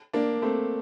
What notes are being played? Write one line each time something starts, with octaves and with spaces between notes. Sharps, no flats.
A#3 D4
A3 C4